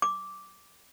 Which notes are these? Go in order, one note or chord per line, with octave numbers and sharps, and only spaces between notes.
D6